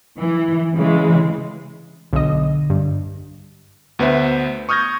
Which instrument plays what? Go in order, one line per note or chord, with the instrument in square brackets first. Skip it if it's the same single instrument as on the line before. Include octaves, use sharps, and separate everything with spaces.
[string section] E3
C#3 E3 G#3
[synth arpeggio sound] B1 D#5 [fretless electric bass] D3
[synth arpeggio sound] G2
[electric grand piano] D2 B3 B4 C5 E5
C#6 D#6 F6 G6 G#6 A#6